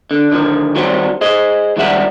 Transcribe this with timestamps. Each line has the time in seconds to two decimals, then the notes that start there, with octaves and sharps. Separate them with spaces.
0.11 D3
0.32 D3 D#3 F3
0.75 D#3 F#3 G3 C4 F#4 C5
1.21 G#4 C5 D#5
1.77 C#2 D#3 F3 G3 E5 F#5